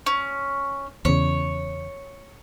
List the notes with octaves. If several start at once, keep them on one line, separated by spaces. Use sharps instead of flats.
C#4
E2 C#3 C#5